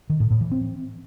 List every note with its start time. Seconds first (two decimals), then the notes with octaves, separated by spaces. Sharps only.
0.10 D#3
0.20 A2
0.30 A2
0.41 E3
0.51 C4